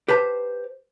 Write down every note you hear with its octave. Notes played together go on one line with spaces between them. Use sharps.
G4 B4 C5 A5